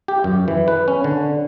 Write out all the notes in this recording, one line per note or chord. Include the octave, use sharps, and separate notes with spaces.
G4
F#2
E3
B4
C#4
D3